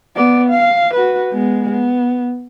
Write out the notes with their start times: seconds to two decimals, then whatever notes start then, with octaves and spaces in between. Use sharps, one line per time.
0.15 B3 D5
0.50 F5
0.94 F#4 B4
1.32 G#3 B3
1.72 B3